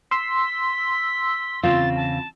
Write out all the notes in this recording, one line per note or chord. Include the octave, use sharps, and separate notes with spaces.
C6 E6 B6
E2 C#3 C4 F4 A6
A5